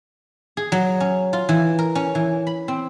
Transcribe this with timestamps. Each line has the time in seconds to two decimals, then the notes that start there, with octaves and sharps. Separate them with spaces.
0.57 G#4
0.72 F#3
1.00 C#4
1.33 F4
1.49 E3
1.79 A#4
1.95 C#4
2.15 E3
2.47 B5
2.68 C4